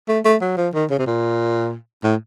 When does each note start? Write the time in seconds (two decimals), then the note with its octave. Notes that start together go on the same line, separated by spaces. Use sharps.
0.08 A3
0.25 A3
0.41 F#3
0.57 F3
0.74 D#3
0.90 C#3
0.99 C3
1.07 A#2
2.04 A2